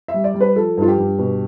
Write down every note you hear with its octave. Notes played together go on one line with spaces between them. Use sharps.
E5
G3
D5
G3
B4
F3 A4
G2 F4
G4
G2
B2